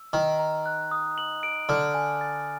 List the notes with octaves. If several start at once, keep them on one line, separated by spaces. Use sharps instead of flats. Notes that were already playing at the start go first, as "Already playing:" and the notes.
Already playing: E6
D#3 A#5
A#5
F#6
D#6
F#7
D7
D3 F6
G#5
A6